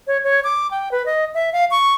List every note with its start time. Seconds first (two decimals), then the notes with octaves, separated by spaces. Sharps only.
0.07 C#5
0.24 C#5
0.44 D6
0.71 G5
0.92 B4
1.06 D#5
1.34 E5
1.53 F5
1.71 C#6